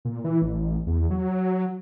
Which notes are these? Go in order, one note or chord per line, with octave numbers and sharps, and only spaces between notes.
A#2
E3
A1
E2
F#3